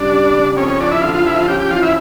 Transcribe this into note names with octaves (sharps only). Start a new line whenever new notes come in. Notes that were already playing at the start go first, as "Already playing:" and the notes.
Already playing: G2 C#3 G3 D4
G3
C#3
F2 C#4
C#4
F3 D4
E4
D3 F4
F4
F3 E4
F4
C#4 G4
G4
E3 F4
E4